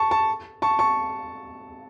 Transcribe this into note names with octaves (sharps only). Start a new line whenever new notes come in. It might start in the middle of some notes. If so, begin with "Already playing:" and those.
Already playing: A5 C#6
A5 C#6
A5 C#6
A5 C#6